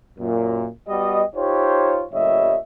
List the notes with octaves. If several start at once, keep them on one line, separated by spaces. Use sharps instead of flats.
F#2 A#2
G3 B3 F#4 G4 D#5
D#4 F4 G4 C5 C#5
G1 A#2 G3 C#5 D#5 E5